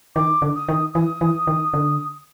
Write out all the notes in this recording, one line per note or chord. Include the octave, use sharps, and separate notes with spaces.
D#3 D6
D3
D#6
D#3
E3 D#6
E3
D#3
D3